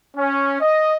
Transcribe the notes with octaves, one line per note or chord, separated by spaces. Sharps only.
C#4
D#5